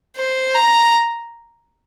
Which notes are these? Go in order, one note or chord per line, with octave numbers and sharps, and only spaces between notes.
C5
A#5